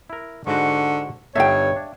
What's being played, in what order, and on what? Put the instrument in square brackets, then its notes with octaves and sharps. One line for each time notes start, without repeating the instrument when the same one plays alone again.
[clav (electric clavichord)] E4 A#4
[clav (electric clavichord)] G#2 F#4 [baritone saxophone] D3 [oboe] C#6
[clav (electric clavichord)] G1 D#4 A4 [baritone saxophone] G2 [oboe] C#5 [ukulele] E5 F5 G5
[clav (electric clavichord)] D4